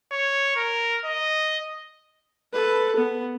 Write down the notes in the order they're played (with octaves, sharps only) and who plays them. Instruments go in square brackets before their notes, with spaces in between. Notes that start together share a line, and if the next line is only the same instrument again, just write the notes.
[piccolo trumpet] C#5
A#4
D#5
[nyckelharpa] A4 B4
B3